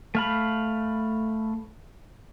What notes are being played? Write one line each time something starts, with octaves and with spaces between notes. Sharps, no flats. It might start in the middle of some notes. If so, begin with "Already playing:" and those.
A3 F5 B5